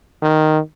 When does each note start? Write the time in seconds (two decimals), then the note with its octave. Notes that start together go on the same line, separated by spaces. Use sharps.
0.22 D#3